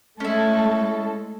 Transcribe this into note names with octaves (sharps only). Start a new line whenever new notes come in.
G#3 A3 C#4 E4 A4